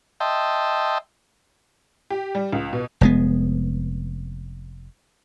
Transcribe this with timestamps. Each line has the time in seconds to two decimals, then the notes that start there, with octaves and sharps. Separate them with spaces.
0.20 D#5 E5 G5 A5 C6
2.10 G4
2.35 G3
2.53 C#2
2.73 B2
3.01 F1 G#3 B3